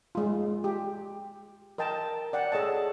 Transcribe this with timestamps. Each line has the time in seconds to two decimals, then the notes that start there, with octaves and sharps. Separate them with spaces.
0.15 G#3 F4
0.64 G4
1.78 A#4 D#5 G5 A5
2.33 D5 F#5 G5
2.52 G#4 A4 C#5 D#5 A5